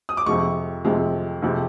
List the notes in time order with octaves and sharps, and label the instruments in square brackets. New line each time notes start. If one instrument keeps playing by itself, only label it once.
[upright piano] D#6
D6
F2 C3 F3 G#3 C#6
F2 C3 F3 G#3
F2 C3 F3 G#3